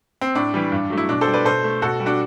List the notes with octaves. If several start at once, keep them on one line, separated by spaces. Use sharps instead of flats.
C4
A2 D4
E3 G3
G2
F#3 A3
E4
B2 D4
A4 C5
G3
B4 D5
B2 A4 C5
A3
B2 F#4 A4
G3
D4 F#4